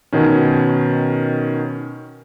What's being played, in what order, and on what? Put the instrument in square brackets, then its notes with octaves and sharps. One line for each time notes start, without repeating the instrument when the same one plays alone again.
[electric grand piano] B2 D#3 C#4